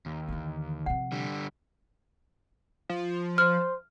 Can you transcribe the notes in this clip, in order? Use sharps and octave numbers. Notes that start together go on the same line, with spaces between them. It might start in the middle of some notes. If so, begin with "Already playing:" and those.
D#2
D3 E3
C3 F3 F#5
D3 G3
F3
C5 F6